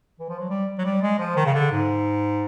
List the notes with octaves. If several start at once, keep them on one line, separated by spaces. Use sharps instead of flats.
E3
F3
F#3
G3
F#3
G3
G#3
F3
D#3
C#3
D3
G#2